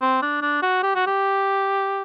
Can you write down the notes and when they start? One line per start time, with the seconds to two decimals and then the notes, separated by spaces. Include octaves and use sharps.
0.01 C4
0.22 D4
0.42 D4
0.62 F#4
0.83 G4
0.95 F#4
1.07 G4